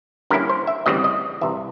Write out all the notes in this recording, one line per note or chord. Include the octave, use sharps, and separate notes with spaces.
D3 G3 A#3 C#4 E4 A#4
C5
E5
D2 C#3 E3 G3 C4 D#5
D5
D#5
C2 C3 E3 E5